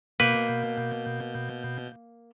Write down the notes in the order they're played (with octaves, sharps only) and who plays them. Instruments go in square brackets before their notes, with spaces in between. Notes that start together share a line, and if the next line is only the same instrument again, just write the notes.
[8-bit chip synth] B2 G6 [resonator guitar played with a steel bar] A#3 [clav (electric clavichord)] B4